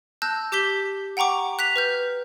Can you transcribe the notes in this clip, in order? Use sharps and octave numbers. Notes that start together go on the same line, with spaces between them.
A5 E6 F#6 G6 A#6
G4 D6 G6 B6 G7
F#5 G5 A#5 C#6 D6
F#6 B6 F7
B4 F6 G6